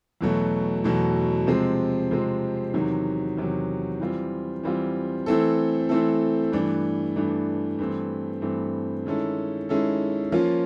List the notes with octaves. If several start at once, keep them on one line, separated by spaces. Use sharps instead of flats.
E2 B2 F#3 A3
E2 B2 F#3 A3
C3 F3 G#3 C4
C3 F3 G#3 C4
E2 C3 D#3 F#3
E2 C3 D#3 F#3
E3 G3 C4 F4
E3 G3 C4 F4
E3 A3 C4 E4 A4
E3 A3 C4 E4 A4
G2 E3 A3 D4
G2 E3 A3 D4
G2 E3 A3 C4
G2 E3 A3 C4
D#3 G#3 C#4 E4 A4
D#3 G#3 C#4 E4 A4
F3 A#3 C#4 F4